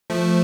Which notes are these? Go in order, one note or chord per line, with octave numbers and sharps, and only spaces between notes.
F3 A3